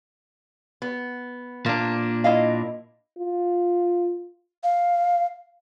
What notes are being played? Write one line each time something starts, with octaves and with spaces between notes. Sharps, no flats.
B3
A#2 A#3 D4
E4 D#5 F5
F4
F5